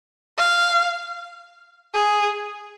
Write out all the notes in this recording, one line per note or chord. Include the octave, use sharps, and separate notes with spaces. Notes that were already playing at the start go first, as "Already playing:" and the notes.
F5
G#4